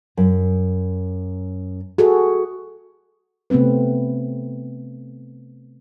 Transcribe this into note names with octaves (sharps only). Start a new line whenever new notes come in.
F#2
F#4 G#4 A4
C3 A3 B3 C4 B4